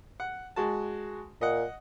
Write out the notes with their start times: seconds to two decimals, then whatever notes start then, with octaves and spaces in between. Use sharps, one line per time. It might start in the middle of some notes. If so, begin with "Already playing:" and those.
0.20 F#5
0.56 G#3 F#4 A5
1.41 A#2 D#5 F#5